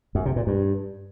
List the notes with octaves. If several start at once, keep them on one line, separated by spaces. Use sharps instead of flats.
F#2
C3
A#2
G2